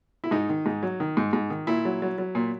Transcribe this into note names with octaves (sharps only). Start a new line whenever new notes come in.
E4
G#2 D#4
D#3
G#2
F#3
D#3
G#2
G#2
D#3
A#2 E4
F#3
F#3
F#3
A#2